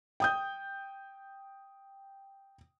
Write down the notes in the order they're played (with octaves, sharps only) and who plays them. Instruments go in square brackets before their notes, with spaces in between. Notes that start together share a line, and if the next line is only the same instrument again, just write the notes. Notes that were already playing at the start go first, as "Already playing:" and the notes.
[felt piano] G5 D#6 G6